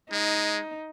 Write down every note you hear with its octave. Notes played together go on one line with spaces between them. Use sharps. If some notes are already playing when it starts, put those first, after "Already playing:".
G#3 D#4